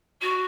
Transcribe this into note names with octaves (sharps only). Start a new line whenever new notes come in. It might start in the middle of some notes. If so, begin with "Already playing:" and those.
F#4